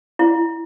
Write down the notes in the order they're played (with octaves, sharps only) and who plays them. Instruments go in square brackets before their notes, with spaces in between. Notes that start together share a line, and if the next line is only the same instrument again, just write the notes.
[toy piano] E4